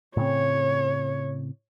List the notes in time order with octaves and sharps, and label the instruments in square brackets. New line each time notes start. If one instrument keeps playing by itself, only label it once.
[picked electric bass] A2 C#3 C4 [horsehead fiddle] C#5